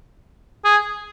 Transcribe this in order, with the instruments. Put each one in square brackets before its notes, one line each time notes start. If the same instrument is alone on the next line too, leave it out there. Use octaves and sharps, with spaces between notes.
[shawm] G#4